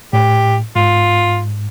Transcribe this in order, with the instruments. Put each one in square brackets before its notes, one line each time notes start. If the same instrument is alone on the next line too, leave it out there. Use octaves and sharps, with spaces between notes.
[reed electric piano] A2 [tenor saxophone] G4
[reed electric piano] G#2 [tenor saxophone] F4